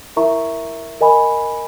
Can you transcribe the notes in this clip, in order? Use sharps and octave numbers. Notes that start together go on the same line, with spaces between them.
E4 A#4 E5 A#5 C#6
A#4 D#5 G#5 B5